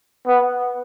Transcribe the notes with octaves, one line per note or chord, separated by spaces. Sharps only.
B3